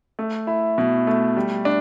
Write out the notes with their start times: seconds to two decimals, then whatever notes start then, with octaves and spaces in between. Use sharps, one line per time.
0.19 A3
0.47 E4
0.78 B2
1.07 A3
1.37 G3
1.65 D4